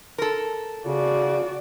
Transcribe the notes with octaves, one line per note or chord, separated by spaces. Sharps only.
A4 A#4
C#3 F#4 D5